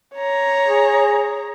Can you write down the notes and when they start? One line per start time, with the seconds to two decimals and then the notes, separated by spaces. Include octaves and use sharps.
0.15 C#5 A#5
0.67 G#4